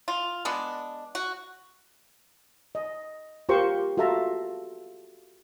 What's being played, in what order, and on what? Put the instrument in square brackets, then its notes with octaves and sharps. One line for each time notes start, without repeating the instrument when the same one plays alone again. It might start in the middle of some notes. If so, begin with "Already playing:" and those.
[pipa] F4
G#3 B3 D4
F#4
[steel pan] D#5
F4 G4 A#4 C5 C#6
F4 F#4 A4 E5 A5 A#5